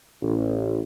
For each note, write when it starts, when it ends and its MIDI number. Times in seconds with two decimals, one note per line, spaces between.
0.22 0.81 33